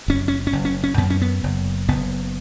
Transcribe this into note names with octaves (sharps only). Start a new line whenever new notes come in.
F#1 C#4
C#4
C#4
F#1
C#4
C#4
F#2 B3
C#4
B3
F#1
F#1 B3